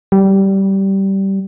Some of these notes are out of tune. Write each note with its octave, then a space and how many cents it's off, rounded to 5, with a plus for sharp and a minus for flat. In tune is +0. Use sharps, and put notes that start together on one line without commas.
G3 -15